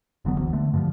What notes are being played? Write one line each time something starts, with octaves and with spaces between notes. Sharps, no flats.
F1 D3 F#3 B3
D2 E3
D3 A3
G2 D3 E3 F3